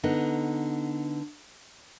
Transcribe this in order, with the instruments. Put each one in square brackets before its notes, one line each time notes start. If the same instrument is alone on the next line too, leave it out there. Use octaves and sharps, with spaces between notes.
[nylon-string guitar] D3 B3 D#4